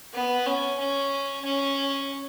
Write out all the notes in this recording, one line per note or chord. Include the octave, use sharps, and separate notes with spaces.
B3
C#4
C#4
C#4